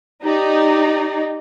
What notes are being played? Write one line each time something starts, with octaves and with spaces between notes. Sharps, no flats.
D#4 G4 D5